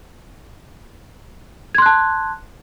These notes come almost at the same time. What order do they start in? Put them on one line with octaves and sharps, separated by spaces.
G#6 C6 F#6 A5